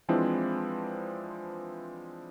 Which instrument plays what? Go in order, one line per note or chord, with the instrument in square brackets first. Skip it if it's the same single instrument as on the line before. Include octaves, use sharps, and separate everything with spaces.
[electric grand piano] E3 F3 G#3 C4 D4 E4